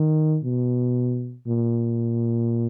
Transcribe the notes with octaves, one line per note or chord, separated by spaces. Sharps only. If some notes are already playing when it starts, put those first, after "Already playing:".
Already playing: D#3
B2
A#2